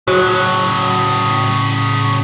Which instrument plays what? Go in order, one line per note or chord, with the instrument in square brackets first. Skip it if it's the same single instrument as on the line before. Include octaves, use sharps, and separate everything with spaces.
[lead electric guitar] A2 C#3 [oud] F#3